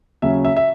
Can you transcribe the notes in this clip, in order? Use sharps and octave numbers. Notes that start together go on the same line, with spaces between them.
D#2 C#3 F#3 C#4 E5
E5
E5